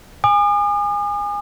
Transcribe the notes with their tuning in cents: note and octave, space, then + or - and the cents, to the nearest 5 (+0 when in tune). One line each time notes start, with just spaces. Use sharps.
G#5 -20 D#6 -45